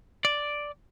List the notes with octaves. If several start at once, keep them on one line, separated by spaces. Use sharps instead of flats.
D5